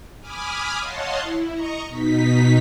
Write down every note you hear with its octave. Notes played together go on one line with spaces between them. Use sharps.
G#5 B5 D6 D#6 F6
C#5 D#5 F5 F#5 A5 C6
E4
D#5 A#5 C#6
B2 D#4 B6